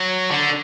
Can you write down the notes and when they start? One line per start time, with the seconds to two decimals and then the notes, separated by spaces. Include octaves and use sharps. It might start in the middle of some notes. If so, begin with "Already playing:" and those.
Already playing: F#3
0.31 D3